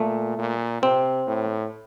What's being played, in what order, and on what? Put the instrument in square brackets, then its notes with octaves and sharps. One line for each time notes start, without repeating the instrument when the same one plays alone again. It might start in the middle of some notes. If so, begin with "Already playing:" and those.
Already playing: [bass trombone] A#2 [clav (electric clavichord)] A3
[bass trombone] A#2
[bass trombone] C3 [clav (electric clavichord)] C4
[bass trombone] A2